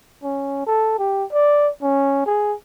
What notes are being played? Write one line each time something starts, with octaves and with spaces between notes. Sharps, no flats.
C#4
A4
G4
D5
C#4
G#4